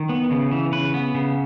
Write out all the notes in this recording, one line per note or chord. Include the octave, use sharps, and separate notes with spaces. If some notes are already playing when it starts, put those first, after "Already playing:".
Already playing: D#3
B3
C#3
E3
C#3 B4
B3
C#3